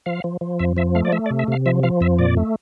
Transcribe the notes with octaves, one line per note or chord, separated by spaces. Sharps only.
F3 F5
F3
F3
F2 E5
F3 E5
A3 F5
D5
A3 E5
D5
C3
E5
C3 F5
F3 E5
F3 F5
F2 E5
A#2 D5
A3